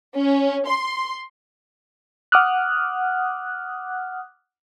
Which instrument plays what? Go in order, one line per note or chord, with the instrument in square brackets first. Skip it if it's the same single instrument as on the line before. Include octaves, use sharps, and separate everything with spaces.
[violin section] C#4
C6
[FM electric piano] F#5 D6 D#6 F6 F#6